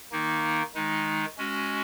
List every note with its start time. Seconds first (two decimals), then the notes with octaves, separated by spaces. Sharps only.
0.12 D#3 A#3 D#4
0.75 D#3 G#3 D#4
1.38 G#3 C#4 F#4